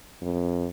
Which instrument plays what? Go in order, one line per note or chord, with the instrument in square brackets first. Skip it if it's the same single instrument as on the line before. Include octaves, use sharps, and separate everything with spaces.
[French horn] F2